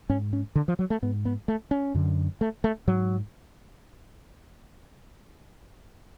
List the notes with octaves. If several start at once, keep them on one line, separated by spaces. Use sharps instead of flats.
G#2 C#4
C#4
D3
F3
F#3
A3
G#2 B3
B3
A3
C#4
F#2 D3
A3
A3
G#2 F#3